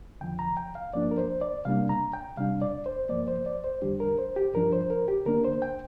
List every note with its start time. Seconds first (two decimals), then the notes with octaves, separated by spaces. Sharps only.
0.21 F2 D3 F3 G5
0.39 A#5
0.57 G5
0.75 F5
0.93 G2 F3 A#3 D4 D5
1.11 A#4
1.18 C5
1.41 D5
1.65 C3 G3 A#3 D4 F5
1.89 A#5
2.14 G5
2.37 C3 G3 D4 F5
2.61 D5
2.86 C5
3.09 G2 F3 A#3 D5
3.28 C5
3.46 D5
3.64 C5
3.82 F2 D3 G3 D4 G4
4.00 A#4
4.18 C5
4.36 G4
4.54 G2 F3 D4 A#4
4.73 C5
4.90 A#4
5.08 G4
5.26 D3 A#3 D4 A#4
5.45 C5
5.62 G5